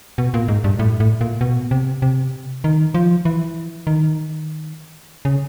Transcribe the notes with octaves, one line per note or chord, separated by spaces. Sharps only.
B2
A#2
G#2
G2
A2
A2
A#2
B2
C3
C3
D#3
F3
E3
D#3
C#3